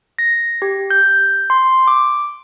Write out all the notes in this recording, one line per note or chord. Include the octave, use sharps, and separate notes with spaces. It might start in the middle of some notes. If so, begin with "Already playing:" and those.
A#6
G4
G6
C6
D6